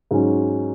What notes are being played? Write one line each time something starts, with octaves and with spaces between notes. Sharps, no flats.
G#2 F#3 C#4